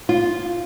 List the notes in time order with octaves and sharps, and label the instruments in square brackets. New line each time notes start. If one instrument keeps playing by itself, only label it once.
[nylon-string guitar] F4